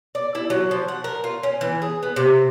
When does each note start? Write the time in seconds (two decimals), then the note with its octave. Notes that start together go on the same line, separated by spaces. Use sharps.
0.15 D5
0.35 E4
0.50 F#3
0.71 F3
0.88 F#5
1.04 A#4
1.24 F4
1.43 C#4
1.61 E3
1.82 G#4
2.03 B3
2.16 C3